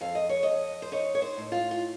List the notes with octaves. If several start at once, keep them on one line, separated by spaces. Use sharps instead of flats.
F2 F5
D#5
C#5
F2 D#5
C5
D#4 C#5
C#5
C5
A2
F4
F4